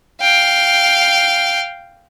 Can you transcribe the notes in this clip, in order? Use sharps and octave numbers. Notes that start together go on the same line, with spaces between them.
F5 G5